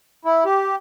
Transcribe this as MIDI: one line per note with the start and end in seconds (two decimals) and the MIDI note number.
0.25 0.44 64
0.45 0.76 67